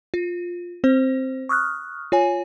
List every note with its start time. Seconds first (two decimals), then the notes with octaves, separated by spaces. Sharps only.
0.14 F4
0.84 C4 C5
1.49 C#6 D#6 F6 F#6
2.12 F4 C#5 G#5